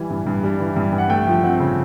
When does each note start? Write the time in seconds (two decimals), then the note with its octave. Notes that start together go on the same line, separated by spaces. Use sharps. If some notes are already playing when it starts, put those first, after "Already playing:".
Already playing: E3 G3 G#5
0.10 G2
0.27 G2
0.43 G3
0.60 E3
0.76 G2
0.93 G2
0.98 F#5
1.09 A3 G5
1.27 F3
1.43 C4 F#5
1.60 C#3